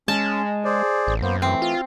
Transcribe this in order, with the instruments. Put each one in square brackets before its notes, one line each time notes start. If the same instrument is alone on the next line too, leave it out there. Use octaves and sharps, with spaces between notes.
[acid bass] G#3 [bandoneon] C#4 [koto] A5
[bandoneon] G#4 C5 D5
[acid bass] A1
[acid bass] F#2 [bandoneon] A#3 B3 C5
[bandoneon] E3 A3 [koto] C4
[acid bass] F4